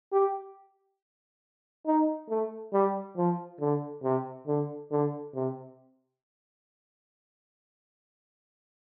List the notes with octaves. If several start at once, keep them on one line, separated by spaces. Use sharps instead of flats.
G4
D#4
A3
G3
F3
D3
C3
D3
D3
C3